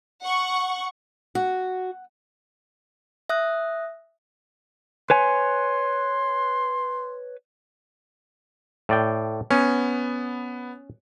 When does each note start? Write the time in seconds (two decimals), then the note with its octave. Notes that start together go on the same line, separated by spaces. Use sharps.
0.22 F#5 C#6
1.35 F#4 F#5
3.29 E5 D#6 F#6
5.10 B4 C#5 G#5 C6
8.89 A2 D5 G5
9.51 B3 C#4